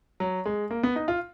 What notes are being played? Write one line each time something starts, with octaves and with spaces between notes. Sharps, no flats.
F#3
G#3
A#3
B3
D#4
F4